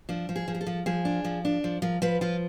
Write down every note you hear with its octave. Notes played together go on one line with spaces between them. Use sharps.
F3 D4
F3
G#4
F3
G#4
A4
F3
F3 G#4
D4
F3
D4
F3
F3 A#4
F3 B4
F3 F4